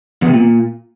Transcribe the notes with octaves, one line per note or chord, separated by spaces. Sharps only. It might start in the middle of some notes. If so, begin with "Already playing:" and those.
E2
C3
A#2